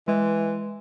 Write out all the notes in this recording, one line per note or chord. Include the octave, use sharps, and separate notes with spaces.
E3 G#3